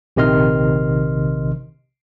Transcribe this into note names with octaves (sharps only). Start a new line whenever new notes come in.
A#1 C3 D#3 D#5 C6 F6